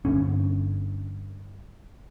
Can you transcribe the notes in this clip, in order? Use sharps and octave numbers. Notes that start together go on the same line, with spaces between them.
G1 D3 C#4